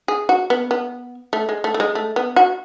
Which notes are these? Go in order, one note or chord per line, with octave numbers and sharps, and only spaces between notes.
G#4
F#4
B3
B3
A3
G#3
A3
A3
G#3
A3
B3
F#4